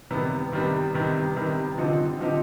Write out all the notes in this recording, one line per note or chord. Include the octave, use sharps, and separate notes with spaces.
C3 D#3 G3 B3
C3 D#3 G3 B3
C3 D#3 G3 B3
C3 D#3 G3 B3
D3 F3 C4 D#4 G4
D3 F3 C4 D#4 G4